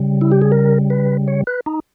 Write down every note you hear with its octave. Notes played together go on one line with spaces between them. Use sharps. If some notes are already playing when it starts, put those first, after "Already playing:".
Already playing: C#3 G3
E4
G4
G#4
A#4
B4
C#5
B4
D#4